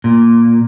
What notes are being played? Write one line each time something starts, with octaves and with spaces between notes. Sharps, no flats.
A#2